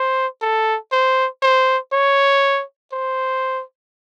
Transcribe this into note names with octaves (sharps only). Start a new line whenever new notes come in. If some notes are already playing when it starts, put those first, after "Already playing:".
Already playing: C5
A4
C5
C5
C#5
C5